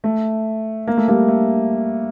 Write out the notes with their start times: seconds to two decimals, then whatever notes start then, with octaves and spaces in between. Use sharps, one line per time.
0.04 A3
0.87 A#3
0.97 A3
1.08 G3 A#3
1.28 A3